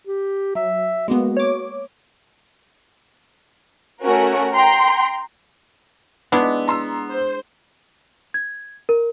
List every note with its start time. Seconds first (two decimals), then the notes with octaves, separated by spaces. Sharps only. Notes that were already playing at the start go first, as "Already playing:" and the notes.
0.07 G4
0.55 F#3 E5
1.08 G#3 A#3 B3 F#4
1.37 C#5 D6
4.05 A3 C#4 F#4 A#4
4.56 G5 A#5 C6
6.32 G#3 B3 D4 E4
6.68 A#5 C6 E6
7.09 C5
8.34 G#6
8.89 A#4